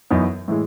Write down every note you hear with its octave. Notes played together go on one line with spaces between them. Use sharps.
F#2 E3 B3 D#4
A2 E3 G#3